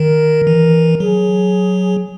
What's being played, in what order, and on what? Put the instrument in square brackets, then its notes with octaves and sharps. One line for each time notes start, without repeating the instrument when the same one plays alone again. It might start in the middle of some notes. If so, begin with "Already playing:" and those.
Already playing: [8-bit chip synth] D#3 [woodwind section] A#4
[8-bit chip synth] E3
[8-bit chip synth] F#3 [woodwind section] G#4